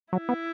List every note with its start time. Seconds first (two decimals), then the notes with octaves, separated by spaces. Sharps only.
0.13 F#3 E4
0.29 B3